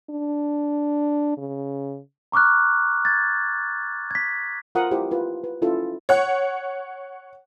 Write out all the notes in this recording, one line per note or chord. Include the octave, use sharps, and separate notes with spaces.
D4
C#3
A#5 C#6 D6 F6 F#6
G#6 A6
G#6 B6
F4 A#4 C5 F#5 D#6
E4 G4 C5
F4 B4
B4
C#4 E4 F4 A4
C#5 F#5